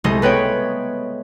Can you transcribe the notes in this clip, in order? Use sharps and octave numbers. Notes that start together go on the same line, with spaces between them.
C2 G#3 A3 D#5
B3 B4 C#5 G5